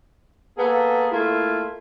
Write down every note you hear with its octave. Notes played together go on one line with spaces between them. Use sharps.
A#3 B3 G#4 A4
A3 A#3 E4 F4